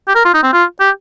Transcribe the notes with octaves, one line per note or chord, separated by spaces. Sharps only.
G4
A#4
F4
D#4
C4
F4
G4